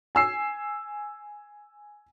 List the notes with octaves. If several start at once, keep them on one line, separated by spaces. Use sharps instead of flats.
G#5 E6 C7